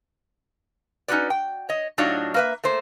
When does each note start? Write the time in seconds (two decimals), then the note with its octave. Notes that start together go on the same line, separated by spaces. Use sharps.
1.08 C#4 D#4 F4 F#4 B4 D5
1.30 G5
1.69 C#5 D#5
1.98 A2 F#3 D4 D#4 F4 F#4
2.34 A#3 B4 E5
2.64 A3 A#3 C5